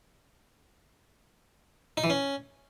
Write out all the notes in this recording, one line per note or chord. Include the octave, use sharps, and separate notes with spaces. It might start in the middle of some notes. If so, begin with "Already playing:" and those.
D#4
E3
C#4